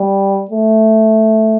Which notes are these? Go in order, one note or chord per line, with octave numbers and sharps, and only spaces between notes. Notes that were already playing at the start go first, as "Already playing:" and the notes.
Already playing: G3
A3